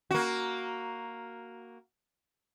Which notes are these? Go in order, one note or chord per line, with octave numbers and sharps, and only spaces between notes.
A#3 F#4